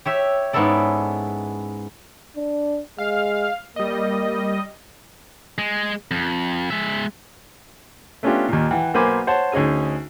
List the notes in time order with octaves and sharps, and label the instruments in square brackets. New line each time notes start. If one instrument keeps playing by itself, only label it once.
[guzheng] G4 C#5 E5
G#2 B3 C#4 E4 A4 D5
[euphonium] D4
[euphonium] G#3 [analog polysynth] F5
[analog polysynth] G3 D#5 [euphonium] A#3
[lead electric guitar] G#3
F2
G#3 E5
[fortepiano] A3 B3 C#4 D4 F4 G4
D#2 A#2
E3 F#5 G5
B1 A#3 C5 G#5 B5 D6
C5 C#5 F#5 A5
D2 C#4 D#4 G#4 G#5